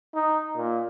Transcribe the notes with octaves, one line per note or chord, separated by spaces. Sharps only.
D#4
A#2